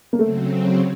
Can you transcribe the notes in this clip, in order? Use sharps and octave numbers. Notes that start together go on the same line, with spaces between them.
A#3
C#3 F#3 A3 C4